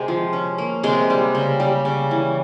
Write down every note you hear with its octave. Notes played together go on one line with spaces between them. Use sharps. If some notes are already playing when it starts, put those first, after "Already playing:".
Already playing: C3 G#3 C4 G#4
F3
C#4
A#3
C3 G#3 G#4
G3
C#3
G3
C#3
E3